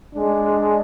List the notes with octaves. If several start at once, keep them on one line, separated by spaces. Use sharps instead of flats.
G#3 D4